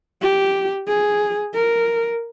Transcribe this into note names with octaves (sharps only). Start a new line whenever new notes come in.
G4
G#4
A#4